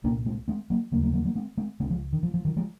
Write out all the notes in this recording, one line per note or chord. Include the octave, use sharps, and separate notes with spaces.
C2 A#2 A#3 C#4
G#3 C4
G#3 C4
F#3 A#3
D#2 C#3 F#3 A#3
F#3 A#3
F#3 A#3
F#3 A#3
G#3 C4
G#3 C4
C#2 C#3 G#3 C4
F3 G#3
D#3
F3
F3
D#3 F#3
F3 G#3